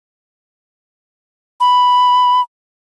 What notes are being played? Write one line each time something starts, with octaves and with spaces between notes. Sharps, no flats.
B5